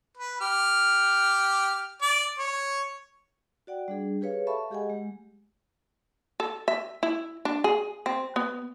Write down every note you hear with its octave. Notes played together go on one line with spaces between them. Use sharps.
B4
G4 F6
D5
C#5
F#4 D5 F#5 G5
G3 D4 G#4
G4 G#4 B4 C#5 F5
A4 E5 F5 A5 B5 C#6
G#3 G4 G#4 D#5 F#5 G#5
G#3
A4
E5
E4
D4
G#4
C4
B3